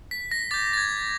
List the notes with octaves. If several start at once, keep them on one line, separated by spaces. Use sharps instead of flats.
B6
A#6
D6 G6 A6
A6
G#6